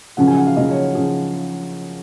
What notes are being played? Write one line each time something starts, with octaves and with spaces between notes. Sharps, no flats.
F#2 C#3 F3 F#5
G#5
F#5
F5
F#2 C#3 F3 D#5
C#5
C#3 F3 G#4